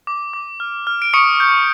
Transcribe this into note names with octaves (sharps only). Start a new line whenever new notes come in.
D6
D6
F6
F6
D7
C#6 D#6 C#7
G6